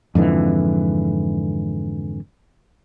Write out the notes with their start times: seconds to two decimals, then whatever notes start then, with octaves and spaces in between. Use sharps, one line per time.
0.15 F2 G#2 D3 E3